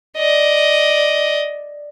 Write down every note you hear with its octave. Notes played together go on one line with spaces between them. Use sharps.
D5 D#5